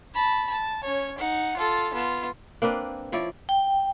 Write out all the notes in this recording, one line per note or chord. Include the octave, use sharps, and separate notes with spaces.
A5 B5
A5
C#4 C#5
D#4 F#5
F4 A4
B3 F4
A#3 C4 D4 B4
F3 E4 C#5 D5
G5